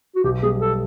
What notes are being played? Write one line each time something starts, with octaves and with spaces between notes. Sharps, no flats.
F#4
B1 G4
G3 G#4
A4